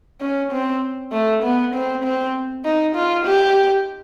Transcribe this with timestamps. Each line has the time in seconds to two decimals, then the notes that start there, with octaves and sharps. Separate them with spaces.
0.21 C#4
0.52 C4
1.12 A3
1.43 B3
1.74 C4
2.04 C4
2.65 D#4
2.95 F4
3.25 G4